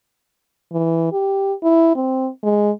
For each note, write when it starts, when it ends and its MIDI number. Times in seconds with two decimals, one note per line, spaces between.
0.72 1.11 52
1.12 1.53 67
1.63 1.95 64
1.95 2.29 60
2.43 2.71 56